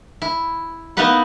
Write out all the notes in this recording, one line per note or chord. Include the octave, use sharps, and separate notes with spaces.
E4
A#3 B3 D#4 E4 B4 F#5